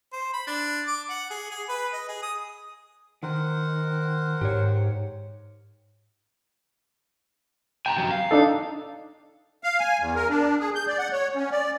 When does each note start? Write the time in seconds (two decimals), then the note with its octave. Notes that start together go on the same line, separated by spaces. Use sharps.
0.12 C5
0.34 B5
0.47 D4
0.88 D6
1.10 F#5
1.31 G#4
1.50 G#4
1.69 B4
1.93 D#5
2.09 G#4
2.22 D#6
3.23 D#3 A#4 C5 F#5
4.41 G#2 G4 C#5
7.86 G5 G#5 A#5
7.98 F#2 F#3
8.11 F5
8.31 D4 D#4 A4
9.64 F5
9.80 G#5
10.00 E2
10.15 A#4
10.30 D4
10.60 G#4
10.75 G6
10.87 D5
10.99 F#5
11.12 C#5
11.36 C#4
11.52 D5